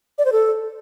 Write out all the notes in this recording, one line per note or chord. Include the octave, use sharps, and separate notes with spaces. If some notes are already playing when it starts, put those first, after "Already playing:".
D5
C5
A4